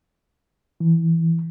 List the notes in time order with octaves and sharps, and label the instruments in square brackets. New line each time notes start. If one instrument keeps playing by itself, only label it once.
[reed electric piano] E3